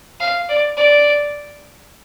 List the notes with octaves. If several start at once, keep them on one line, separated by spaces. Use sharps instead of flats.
F5
D5
D5